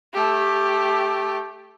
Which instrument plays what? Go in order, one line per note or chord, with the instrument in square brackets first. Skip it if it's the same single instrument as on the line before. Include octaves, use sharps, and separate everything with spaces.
[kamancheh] A3 G4